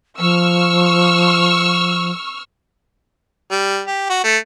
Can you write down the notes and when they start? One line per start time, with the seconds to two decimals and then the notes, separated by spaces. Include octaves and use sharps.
0.19 F3 C#6 E6 F6
3.51 G3
3.87 G4
4.10 F#4
4.24 A3